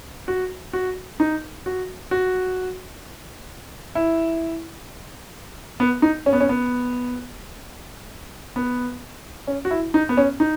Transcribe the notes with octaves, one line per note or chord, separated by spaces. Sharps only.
F#4
F#4
D#4
F#4
F#4
E4
B3
D#4
C#4
B3
C#4
B3
B3
C#4
F#4
E4
D#4
B3
C#4
D#4